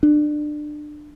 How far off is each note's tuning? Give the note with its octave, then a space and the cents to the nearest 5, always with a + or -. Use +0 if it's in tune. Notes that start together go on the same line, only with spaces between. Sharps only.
D4 +25